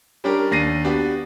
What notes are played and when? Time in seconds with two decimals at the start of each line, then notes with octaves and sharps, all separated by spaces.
0.24 G3 C#4 D4 G4 A#4
0.51 D#2 D4 A#6 C7 D#7
0.84 B3 D4 F#4 G4